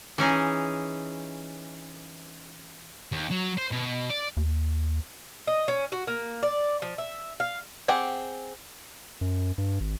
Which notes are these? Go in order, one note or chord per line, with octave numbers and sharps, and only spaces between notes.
E3 C#4 D#4 G#4
D#2
F#3
C5
B2
D5
D#2
D#5
C#4
F#4
A#3
D5
F3
E5
F5
C4 G4 G#4 F#5 G5
F#2
G2
G#1